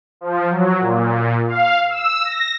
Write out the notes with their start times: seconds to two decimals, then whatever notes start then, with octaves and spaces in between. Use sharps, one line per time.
0.21 F3
0.50 F#3
0.80 A#2
1.47 F5
1.89 E6
2.25 A#6